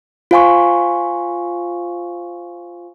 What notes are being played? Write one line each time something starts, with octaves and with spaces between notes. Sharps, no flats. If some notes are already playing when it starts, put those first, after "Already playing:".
F4 C5 F5 G#5 C6 C#6